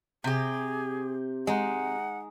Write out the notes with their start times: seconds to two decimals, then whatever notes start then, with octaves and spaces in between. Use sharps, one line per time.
0.24 C3 G4 G#4
1.47 G#3 D#4 F#5